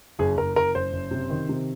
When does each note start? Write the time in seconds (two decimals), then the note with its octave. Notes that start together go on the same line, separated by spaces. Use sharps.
0.19 F#1 G#4
0.37 F#1 A#4
0.55 F#1 A#4
0.75 F#1 C5
0.93 F#1
1.11 C3
1.30 D#3
1.49 C3